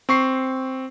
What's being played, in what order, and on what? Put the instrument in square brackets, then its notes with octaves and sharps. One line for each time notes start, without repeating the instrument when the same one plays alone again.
[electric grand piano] C4 C#6 C7